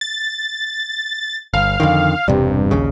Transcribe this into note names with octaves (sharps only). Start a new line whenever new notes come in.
A6
G1 F5
F2 D3 D#3
E1 G2 C3
A#1 D#2 C#3